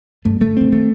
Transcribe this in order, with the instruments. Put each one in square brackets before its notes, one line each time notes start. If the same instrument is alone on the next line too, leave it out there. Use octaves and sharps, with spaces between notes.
[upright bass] G2 [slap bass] A3
[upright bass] D3 [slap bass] A3
[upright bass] D3 [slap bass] C4
[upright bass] D#3 [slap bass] A3